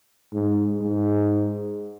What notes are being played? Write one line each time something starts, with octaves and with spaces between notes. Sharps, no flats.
G#2
G#2